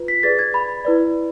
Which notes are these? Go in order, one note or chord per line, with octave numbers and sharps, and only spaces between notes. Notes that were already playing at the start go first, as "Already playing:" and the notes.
Already playing: F4 B4
B6
G#4 B4 D5 A6
G#6
B5
E4 B4 D5